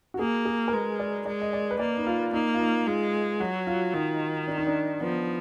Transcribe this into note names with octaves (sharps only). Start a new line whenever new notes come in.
F#4
A#3 G#4
G#4
A#4
G#3 B4
D5
G#3 D5
D#5
D5
B4
A#3 D5
D#4
F4
A#3 D#4
F4
D#4
G#3 F4
F#3 F#4
F4
D#3 D#4
D4
D#4
D4
F3 B3